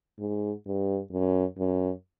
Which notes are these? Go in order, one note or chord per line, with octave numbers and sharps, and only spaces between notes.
G#2
G2
F#2
F#2